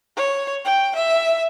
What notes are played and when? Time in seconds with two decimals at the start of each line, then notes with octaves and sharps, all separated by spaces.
0.17 C#5
0.65 G5
0.96 E5